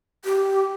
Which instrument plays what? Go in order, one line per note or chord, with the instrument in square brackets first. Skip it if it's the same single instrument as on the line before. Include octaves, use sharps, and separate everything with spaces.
[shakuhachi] G4